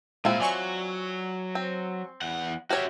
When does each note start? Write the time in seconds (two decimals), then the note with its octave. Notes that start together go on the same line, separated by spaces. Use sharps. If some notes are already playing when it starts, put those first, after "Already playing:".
0.25 A#2 G#3 C4 E4 F4
0.40 F#3 D5 G#5 C#6
1.55 C4
2.22 E2 F#5
2.70 F#4 G4 C#5 E5 F6